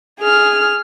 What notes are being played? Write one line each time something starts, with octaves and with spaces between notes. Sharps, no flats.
G#4 F6